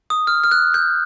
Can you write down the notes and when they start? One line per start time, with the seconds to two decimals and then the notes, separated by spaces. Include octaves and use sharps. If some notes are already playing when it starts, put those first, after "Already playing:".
0.10 D#6
0.27 F6
0.44 F6
0.51 F#6
0.74 G6